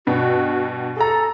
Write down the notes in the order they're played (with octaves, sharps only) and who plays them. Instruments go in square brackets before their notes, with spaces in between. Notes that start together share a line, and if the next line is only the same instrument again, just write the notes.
[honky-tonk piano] G2 B2 [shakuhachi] F#4
[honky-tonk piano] G#4 A#5 [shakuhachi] A4